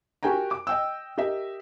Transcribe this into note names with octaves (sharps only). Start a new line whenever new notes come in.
F#4 G4 A#4 G5 G#5 A#5
D6
D#5 G5 E6
G4 A#4 D#5 E5